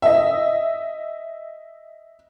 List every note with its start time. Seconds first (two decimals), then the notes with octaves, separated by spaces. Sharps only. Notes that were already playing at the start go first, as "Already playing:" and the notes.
0.02 D#5 E5